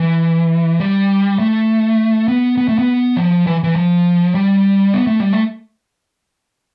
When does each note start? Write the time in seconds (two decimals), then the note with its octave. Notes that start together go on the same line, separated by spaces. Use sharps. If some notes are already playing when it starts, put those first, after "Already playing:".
Already playing: E3
0.80 G3
1.39 A3
2.28 B3
2.57 B3
2.68 A3
2.79 B3
3.17 F3
3.47 E3
3.64 E3
3.76 F3
4.35 G3
4.94 B3
5.07 A3
5.20 G3
5.33 A3